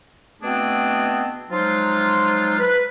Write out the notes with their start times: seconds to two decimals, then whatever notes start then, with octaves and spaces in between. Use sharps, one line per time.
0.42 B2 A3 B3 C4 D4 G#4
1.50 F3 F#3 G#3 D#4 F4
2.60 B4